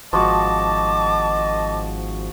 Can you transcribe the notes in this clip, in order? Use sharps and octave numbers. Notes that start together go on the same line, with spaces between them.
G#1 F3 F#4 D#5 A5 D6